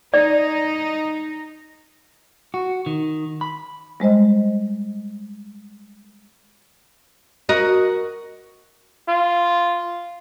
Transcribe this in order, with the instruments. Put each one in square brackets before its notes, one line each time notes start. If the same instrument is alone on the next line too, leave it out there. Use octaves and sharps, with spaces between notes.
[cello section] D#4 [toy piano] D5
[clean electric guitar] F#4
D#3
B5
[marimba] G3 G#3 C5 D#5
[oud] F#4 A#4 D#5
[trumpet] F4